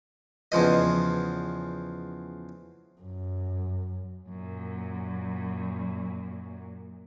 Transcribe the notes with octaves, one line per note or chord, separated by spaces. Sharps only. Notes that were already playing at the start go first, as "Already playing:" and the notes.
E2 C#3 F3 D#5
F#2
F#2 A#2